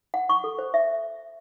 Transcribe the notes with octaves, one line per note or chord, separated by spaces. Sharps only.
F#5
C#6
A4
C5
E5